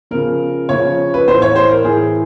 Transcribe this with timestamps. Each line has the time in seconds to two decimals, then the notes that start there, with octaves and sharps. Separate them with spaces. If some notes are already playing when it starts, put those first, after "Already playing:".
0.11 C#3 F3 A#4
0.69 C#3 F3 C#5
1.14 B4
1.27 A2 E3 C5
1.42 C#5
1.56 C5
1.71 A#4
1.84 A2 E3 G#4